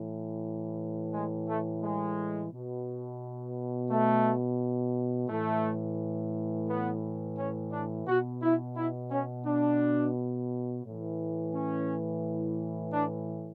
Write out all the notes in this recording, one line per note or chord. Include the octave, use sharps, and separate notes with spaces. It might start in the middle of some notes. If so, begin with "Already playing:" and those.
Already playing: A2 E3
G#3
A3
G#3
B2
A3
A2 E3 A3
B3
C#4
D4
B2 F#4
E4
E4
C#4
D4
A2 E3
C#4
D4